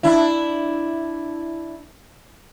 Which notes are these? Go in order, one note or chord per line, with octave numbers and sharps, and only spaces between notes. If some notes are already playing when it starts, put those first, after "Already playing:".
D4 E4